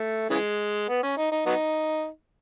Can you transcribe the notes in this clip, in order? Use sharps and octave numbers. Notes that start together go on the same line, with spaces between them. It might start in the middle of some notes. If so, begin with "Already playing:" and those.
Already playing: A3
C#3 E3 G#3
B3
C#4
D#4
D#4
F#3 B3 D#4